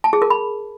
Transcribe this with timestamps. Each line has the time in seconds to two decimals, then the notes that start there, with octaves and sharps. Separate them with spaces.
0.04 A5
0.13 G#4
0.22 A#4
0.30 B5